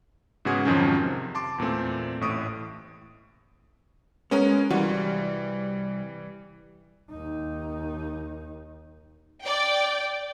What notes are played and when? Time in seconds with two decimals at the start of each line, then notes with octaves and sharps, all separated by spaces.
0.45 G#2 C#3 B3 F#4 G#4 G#6
0.65 F2 G#2 D#3 F3 F#3 C#4
1.03 C3
1.35 A5 C6 D6
1.58 E2 A#2 A3 C4
2.21 A1 A2 C#6 D#6 D7
4.31 G#3 B3 C#4 A#4
4.70 C2 E3 G3 F#4 F5
7.10 D#2 D#4
9.44 D5 G5